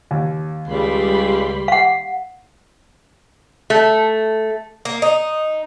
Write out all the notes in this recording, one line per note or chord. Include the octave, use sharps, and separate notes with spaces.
D#2
C#2 G3 B5 C6
F5 F#5
A3
A#3
D#4